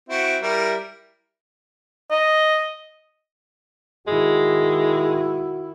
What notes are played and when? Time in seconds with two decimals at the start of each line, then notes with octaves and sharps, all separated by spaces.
0.09 C4 E4 F#4
0.42 G3 E4 A#4
2.11 D#5
4.07 D#3 G#3 E4 F#4